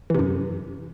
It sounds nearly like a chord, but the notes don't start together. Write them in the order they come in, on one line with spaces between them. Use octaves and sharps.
E3 C3 F#2